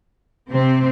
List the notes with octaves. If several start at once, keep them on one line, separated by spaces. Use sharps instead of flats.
C3 C4